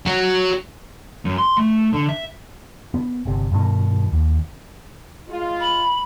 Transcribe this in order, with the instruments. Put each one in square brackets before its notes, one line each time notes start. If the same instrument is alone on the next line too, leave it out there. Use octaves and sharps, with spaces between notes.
[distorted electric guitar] F#3
[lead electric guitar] F#2
C6
A3
D3
E5
[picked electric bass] B3
G1 C3
G2 B2 D#3
D#2
[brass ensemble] G#3 F4
[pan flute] B5